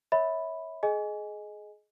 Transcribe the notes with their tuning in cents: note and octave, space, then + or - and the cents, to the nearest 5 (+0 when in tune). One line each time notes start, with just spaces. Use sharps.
C#5 +0 E5 -30 B5 +0
G#4 +25 D#5 +0 G#5 +0